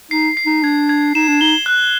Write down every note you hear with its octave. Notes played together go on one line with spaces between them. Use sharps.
D#4 C7
C7
D#4
D4 G#6
G#6
D#4 E7
D4
D#4 G7
F#6